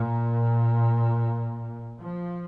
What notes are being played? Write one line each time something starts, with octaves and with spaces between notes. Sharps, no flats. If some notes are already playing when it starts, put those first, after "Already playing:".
Already playing: A#2
F3